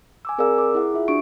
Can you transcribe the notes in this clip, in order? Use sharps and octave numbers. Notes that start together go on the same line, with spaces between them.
G#5 D6 E6
C4 G#4 A#4 D5 F5 E6
D6
E4 G#4 F#5
F4 E5
D4 F#4 C#6 D7